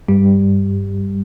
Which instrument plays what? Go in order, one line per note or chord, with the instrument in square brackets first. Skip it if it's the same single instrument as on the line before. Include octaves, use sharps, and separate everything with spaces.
[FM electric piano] G2 G3